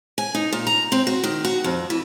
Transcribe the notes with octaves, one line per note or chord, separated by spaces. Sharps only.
G#5
D#4
A#2
A#5
C4
F#4
D#3
F#4
F2
E3